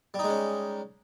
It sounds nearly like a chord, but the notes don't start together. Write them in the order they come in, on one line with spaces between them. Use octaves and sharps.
G3 D#4 G#3 C#4